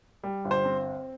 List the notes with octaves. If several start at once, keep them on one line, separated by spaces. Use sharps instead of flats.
G3
G1
C5
C4